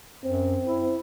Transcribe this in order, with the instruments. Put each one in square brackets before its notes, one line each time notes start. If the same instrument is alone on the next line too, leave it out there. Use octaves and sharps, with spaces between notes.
[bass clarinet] F#2 [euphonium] C4
[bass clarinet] E4